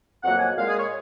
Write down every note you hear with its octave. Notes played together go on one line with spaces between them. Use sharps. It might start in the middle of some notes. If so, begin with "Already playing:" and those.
F2 D#3 F#3 A#3 F#5
G#5
A#2 G#3 F5
G#4
C#5